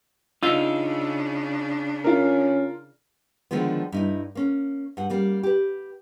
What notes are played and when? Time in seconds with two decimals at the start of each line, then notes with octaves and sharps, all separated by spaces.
0.43 C#3 D4 D#4 F4 E6
2.04 C#4 F4 A#4
3.51 D3 D#3 F3 G#3 B3
3.92 G2 D#4 E4
4.35 A#3 C#4
4.97 G2 F#5
5.10 G3 A#3 C#4
5.43 G4 B4